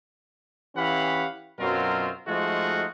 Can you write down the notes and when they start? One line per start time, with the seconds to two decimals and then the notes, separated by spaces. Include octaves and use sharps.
0.76 E3 C#4 G4 F5 F#5 B5
1.60 F#2 B2 F#3 C4 F4 A#4
2.27 F3 G#3 A3 D#4 F4 F#4